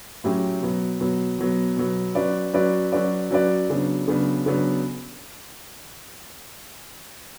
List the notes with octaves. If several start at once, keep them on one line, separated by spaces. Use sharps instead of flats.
A2 F#3 C#4 G4
B2 F#3 B3
B2 F#3 B3
B2 F#3 B3
B2 F#3 B3
F#3 C#4 F#4 B4 D5
F#3 C#4 F#4 B4 D5
F#3 C#4 F#4 B4 D5
F#3 C#4 F#4 B4 D5
C#3 F#3 B3 D4
C#3 F#3 B3 D4
C#3 F#3 B3 D4